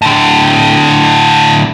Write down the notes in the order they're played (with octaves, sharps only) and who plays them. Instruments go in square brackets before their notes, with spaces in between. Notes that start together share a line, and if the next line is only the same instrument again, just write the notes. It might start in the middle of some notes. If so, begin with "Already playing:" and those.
[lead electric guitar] A2 D3